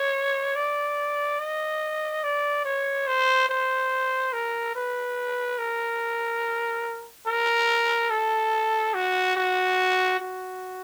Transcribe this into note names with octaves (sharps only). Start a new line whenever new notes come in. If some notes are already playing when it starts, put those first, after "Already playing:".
Already playing: C#5
D5
D#5
D5
C#5
C5
C5
A#4
B4
A#4
A#4
A4
F#4
F#4
F#4